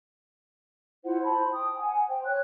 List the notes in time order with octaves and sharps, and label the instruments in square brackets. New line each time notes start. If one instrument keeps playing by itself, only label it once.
[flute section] E4 F4 C5 F#5
C5 A5 B5
G5 D#6
F#5 G#5
C5 G5
C#5 F#6